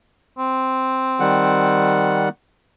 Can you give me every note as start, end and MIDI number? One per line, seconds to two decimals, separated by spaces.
0.38 2.25 60
1.20 2.29 51
1.20 2.29 55
1.20 2.29 78